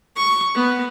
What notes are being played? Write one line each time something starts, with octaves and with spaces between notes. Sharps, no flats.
C#6
B3